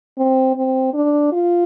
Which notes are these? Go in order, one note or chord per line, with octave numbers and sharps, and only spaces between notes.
C4
C4
D4
F4